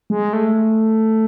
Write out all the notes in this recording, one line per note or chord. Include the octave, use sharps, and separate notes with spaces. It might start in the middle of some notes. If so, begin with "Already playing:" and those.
G#3
A3